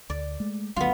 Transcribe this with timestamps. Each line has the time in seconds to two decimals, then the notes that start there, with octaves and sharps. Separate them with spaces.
0.10 D2 D5
0.40 G#3 A3
0.76 G#1 D2 F#3 B3 F4